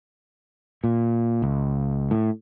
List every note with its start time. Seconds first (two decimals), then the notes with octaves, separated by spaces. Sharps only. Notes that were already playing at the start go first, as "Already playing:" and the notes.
0.84 A#2
1.42 C#2
2.11 A2